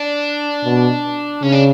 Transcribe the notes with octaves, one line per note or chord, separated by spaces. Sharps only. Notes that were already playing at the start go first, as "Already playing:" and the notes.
Already playing: D4
B2
C#3 C#4
D4